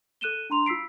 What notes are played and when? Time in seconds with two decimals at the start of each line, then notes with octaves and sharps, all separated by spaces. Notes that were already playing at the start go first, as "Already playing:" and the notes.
0.21 A4 F#6 D#7 E7 G7
0.50 D4 A#5 C6 F7
0.66 F4 E6 B6 C7 D7